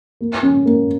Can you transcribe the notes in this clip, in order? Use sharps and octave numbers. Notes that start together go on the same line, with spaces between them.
A#3
C#4
A#3